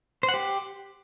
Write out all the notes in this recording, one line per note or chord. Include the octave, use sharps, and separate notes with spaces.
C5
F#5
G4